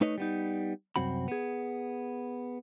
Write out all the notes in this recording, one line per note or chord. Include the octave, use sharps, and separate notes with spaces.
A3 D#4 B4 C#5 D#5
G3 B3 D#4
C2 F#2 C4 F#4 B5
B3 G#4